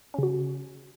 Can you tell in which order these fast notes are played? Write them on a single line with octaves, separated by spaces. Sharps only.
C#4 C#3 F#4